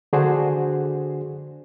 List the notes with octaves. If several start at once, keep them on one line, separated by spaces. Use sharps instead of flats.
D3 D4 F#4 G#4 C5